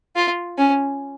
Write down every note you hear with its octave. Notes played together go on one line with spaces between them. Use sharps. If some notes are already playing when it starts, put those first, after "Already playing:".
F4
C#4